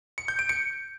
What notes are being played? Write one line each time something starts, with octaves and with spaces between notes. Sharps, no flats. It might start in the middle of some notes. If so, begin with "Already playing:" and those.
C#7
G6
D7
C#7